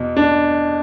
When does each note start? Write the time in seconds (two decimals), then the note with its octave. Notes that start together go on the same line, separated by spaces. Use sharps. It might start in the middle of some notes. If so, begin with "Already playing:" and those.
Already playing: E2 B2
0.16 D4